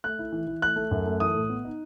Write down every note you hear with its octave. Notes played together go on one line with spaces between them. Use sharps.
A3 F#6
E4
E3
E3
A3 F#6
A3
F#2
A3
E3 D#6
A2
B3
D#4